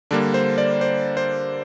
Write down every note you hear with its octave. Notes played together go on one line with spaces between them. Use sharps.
D3 G3 A#3 D4
C5
D5
C5
C5